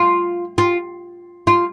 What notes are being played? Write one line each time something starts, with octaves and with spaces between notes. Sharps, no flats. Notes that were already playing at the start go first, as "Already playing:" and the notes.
Already playing: F4
F4
F4